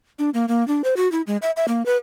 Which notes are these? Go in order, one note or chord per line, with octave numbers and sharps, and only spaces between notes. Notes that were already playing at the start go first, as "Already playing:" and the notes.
D4
A#3
A#3
D4
C5
F#4
E4
G#3
E5
E5
A#3
B4